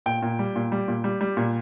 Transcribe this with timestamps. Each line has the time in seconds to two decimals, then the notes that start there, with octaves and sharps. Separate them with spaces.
0.06 A#2 G5
0.22 A#2
0.39 G3
0.56 A#2
0.72 G3
0.88 A#2
1.04 G3
1.21 G3
1.37 A#2